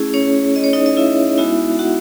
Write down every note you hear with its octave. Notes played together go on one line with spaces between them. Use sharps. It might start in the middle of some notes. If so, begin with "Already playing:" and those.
Already playing: A3 C#4 E4 G#4
C#4 C#5
D#5
C#5
D#4 D#5
D#5
E4 E5
G#3 B3 D#4 E4 F#4 E5
F#4 F#5